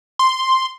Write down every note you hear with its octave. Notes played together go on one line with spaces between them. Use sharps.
C6